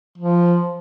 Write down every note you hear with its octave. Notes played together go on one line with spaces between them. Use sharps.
F3